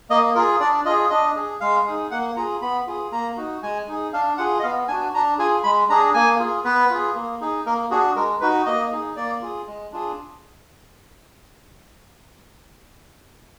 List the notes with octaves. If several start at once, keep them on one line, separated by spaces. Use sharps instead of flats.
A#3 D#5
F4 G#4 A#4
D4 D5
F4 G#4 D#5
D4 D#5
G#4
G#3 F5
D#4 G#4
A#3 F#5
F4 G#4 A#5
B3 B5
F4 G#4
A#3 A#5
D#4 F#4
G#3 G#5
D#4 G#4
D4 F5
F4 G#4 F#5
D#5
B3 F5
D4 F#4 G#5
D4 A#5
F4 G#4 G#5
G#3 B5
D4 G#4 A#5
A#3 G#5
F4 G#4
B3 B4
F4 G#4
A#3
D#4 G#4
A#3 A#4
D4 F#4 G#4
G#3 A#4
D#4 F#4 B4
A#3 D#5
D#4 G#4
A#3 D5
F4 G#4
G#3
D4 F4 G#4